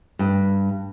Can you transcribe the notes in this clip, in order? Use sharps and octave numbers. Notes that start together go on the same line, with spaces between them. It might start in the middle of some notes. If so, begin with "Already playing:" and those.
G2